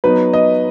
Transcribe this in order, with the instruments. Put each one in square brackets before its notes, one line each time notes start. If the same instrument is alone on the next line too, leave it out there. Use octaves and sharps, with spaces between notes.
[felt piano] F#3 B3 D#4 [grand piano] B4
[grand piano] D#5